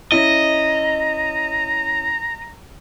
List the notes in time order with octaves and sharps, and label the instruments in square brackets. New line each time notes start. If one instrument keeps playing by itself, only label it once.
[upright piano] C#4 E4 [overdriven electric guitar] D#5 [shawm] A#5